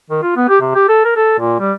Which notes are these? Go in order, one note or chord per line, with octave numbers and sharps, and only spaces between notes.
D#3
F4
B3
G4
C3
G4
A4
A#4
A4
A#2
G3